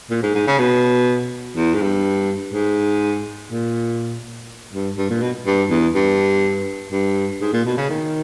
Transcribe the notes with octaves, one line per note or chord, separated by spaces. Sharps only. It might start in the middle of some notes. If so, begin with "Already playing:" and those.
A#2
G#2
G#2
C#3
B2
E2
G#2
G2
G#2
A#2
G2
G2
A#2
B2
G2
E2
G2
G2
G#2
A#2
B2
C#3
D#3